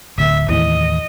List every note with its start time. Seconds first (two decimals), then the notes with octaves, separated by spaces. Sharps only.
0.18 D1 D2 E5
0.49 D#2 A2 E3 D#5